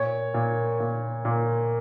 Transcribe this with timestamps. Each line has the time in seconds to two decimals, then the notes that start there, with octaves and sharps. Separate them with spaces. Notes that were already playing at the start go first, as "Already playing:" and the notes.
Already playing: A#2 C#5
0.34 A#2
0.80 A#2
1.25 A#2